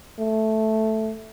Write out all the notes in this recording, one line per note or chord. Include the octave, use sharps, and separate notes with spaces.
A3